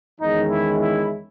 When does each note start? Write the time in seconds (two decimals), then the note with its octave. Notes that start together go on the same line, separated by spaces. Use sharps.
0.20 E2 D#3 G#3 C#4 D#4
0.50 E4
0.80 E4